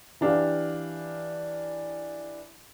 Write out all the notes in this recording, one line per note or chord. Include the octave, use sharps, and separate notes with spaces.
E3 D4 G4 F5